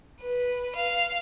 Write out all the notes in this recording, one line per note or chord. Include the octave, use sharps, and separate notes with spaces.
B4
F5